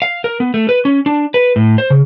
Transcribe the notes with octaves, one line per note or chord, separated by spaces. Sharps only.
F5
A#4
B3
A3
B4
C#4
D4
B4
A2
C5
C#3